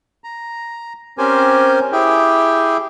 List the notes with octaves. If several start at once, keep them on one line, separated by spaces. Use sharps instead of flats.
A#5
C4 C#4 G4 A#4 C5 G#5
E4 G4 G#4 G5